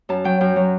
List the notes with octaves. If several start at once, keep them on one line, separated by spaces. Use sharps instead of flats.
F#2 A5
F#3 G5
F#2 G5
F#3